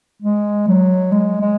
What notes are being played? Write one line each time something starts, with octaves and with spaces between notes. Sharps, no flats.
G#3
F#3
G#3
G#3